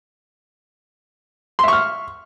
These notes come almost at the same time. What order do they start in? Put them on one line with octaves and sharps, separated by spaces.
C6 E5 C#6 F6